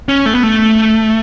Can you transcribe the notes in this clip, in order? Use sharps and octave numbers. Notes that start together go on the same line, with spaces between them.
C#4
A3
B3
A3